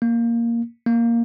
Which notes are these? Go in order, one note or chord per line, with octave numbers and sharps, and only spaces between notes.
A#3
A#3